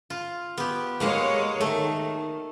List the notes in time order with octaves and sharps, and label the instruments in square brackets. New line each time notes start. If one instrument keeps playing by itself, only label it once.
[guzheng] F4
B3 G4
[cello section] G#3 C#5 [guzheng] A#3 F5 F#5
[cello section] D#3 [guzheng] A3